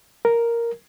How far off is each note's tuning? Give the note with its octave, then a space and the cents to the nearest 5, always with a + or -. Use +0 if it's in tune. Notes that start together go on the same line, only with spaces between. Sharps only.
A#4 +0